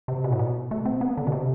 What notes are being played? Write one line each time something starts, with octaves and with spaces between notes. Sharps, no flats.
C3
B2
A2
B2
A3
C4
B3
D3
B2
C3